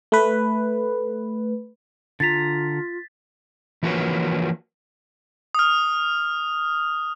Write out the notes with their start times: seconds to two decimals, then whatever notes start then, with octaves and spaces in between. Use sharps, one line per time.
0.12 A3 B4
2.20 D3 F4 A#5 A6 B6
3.83 E3 F3 A#3 F#4 B4 C#5
5.55 D#6 F6